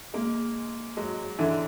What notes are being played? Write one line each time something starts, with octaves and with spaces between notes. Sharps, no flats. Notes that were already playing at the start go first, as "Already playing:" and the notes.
G#3 A#3
F#3 G#3
D3 E3